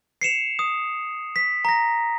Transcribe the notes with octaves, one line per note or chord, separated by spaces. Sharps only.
C7 C#7 E7 F7
D#6
B6
A#5 A#6